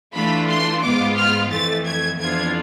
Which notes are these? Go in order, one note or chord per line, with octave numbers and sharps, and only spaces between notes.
E3 A3 D4 F4 B5
C6
G#2 G#3 B3 F4 D6
F6
F2 E3 A3 A6
G#6
F2 E3 B3 D4 F4 G#6